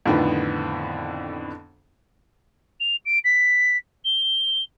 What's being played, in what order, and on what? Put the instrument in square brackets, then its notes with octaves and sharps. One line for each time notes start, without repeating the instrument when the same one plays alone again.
[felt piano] F2 A2 D3 D#3 B3
[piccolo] F7
D7
B6
G7